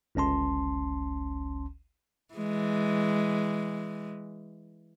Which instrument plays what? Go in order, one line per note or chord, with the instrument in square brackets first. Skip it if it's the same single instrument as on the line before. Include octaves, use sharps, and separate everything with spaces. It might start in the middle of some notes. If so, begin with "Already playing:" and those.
[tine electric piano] G1 C#2 C#4 A5 C6
[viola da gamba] E3 G#3